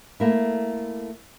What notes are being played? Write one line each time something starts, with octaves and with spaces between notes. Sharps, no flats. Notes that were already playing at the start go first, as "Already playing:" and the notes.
A3 A#3 E4